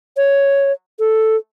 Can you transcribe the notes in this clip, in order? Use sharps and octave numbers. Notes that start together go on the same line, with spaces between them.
C#5
A4